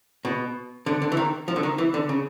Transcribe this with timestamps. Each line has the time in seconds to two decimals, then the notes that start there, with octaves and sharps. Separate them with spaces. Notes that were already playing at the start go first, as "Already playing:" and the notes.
0.25 B2
0.86 D3
1.02 D3
1.12 E3
1.17 D#3
1.48 F3
1.56 D3
1.63 D#3
1.78 E3
1.94 D3
2.09 C#3